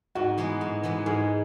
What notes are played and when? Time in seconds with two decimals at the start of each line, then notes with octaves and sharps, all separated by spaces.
0.15 G#2 F#4
0.38 E3 G#3 B3
0.61 G#2
0.83 E3 G#3 B3
1.06 G#2 G#4